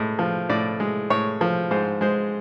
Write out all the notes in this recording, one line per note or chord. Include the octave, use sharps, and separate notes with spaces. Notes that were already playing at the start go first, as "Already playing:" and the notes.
Already playing: A2 G#3 D#5
F3
A2 D5
G#3
A2 C#5
F3
G#2 C5
G#3 C5